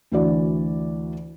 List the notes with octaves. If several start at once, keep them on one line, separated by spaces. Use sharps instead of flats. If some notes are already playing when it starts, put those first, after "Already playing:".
D2 E3 F#4 D5